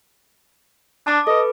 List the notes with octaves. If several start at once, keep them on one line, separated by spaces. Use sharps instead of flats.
D4 A5 D6
A4 B4 D#5